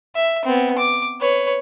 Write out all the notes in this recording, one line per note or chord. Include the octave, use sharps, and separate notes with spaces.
E5
B3 C4
D6
B4 C#5